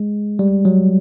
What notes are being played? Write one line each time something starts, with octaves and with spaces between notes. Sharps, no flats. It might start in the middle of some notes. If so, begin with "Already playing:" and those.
Already playing: G#3
G3
F#3